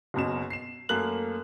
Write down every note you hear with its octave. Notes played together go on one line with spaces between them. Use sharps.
F#1 F#2 B2 E7
C7 E7
F#2 A3 A#3 F#6 F#7